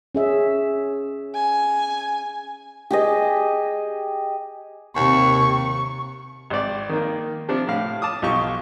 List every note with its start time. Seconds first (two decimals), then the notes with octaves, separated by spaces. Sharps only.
0.15 C#4 G#4 E5
1.35 G#5
2.91 G4 G#4 D#5
4.96 D#2 C3 C#6
6.50 G#1 D5
6.89 D#3 A#3
7.48 C3 F3 D4
7.68 A2 F5
8.02 A5 D6 D#6
8.22 B1 F4 G4 C#6